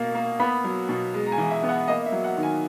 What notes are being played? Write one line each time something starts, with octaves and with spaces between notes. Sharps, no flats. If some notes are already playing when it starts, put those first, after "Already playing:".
Already playing: B2 A#3
A#3
B3 B5
F#3
B2
G#3
A#5
G#5
E3
E5
B3
F#5
A#3 D#5
E5
F#3
F#5
D#3
G#5